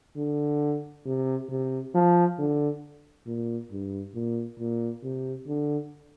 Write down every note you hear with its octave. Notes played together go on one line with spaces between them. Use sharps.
D3
C3
C3
F3
D3
A#2
G2
A#2
A#2
C3
D3